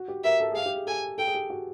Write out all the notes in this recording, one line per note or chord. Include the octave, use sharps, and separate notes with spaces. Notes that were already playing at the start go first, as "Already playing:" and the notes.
Already playing: F#4
G4
A#4 E5
A4
G#4
G4 F5
G4
G#4
A4 G#5
A4 G5
G#4
G4
F#4